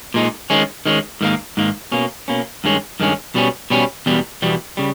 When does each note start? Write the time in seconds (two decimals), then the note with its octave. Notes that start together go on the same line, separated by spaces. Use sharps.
0.14 A#2 G#3 D#4
0.50 D#3 G#3 C#4
0.86 D#3 G#3 C#4
1.21 G#2 D#3 A#3
1.57 G#2 D#3 A#3
1.92 B2 A#3 C#4
2.28 B2 A#3 C#4
2.64 G2 D#3 G#3 C#4
3.00 G2 D#3 G#3 C#4
3.35 B2 G3 C#4
3.70 B2 G3 C#4
4.06 E2 B2 G3
4.42 E2 B2 G3
4.77 C#3 G3